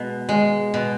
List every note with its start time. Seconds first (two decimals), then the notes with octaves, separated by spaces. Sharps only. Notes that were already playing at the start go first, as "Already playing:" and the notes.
Already playing: B2 G#3
0.29 G#3
0.74 B2